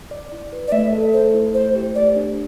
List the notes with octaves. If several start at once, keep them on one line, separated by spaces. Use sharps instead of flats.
D5
E4
B4
D5
A3 E5
A4
A3 C5
E4
A3 C5
G4
A3 D5
D4